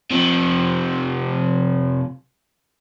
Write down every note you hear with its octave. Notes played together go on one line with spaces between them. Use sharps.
C3 F3